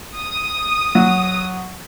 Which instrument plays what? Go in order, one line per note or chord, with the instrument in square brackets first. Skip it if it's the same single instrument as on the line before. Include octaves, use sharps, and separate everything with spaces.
[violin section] D#6
[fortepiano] F#3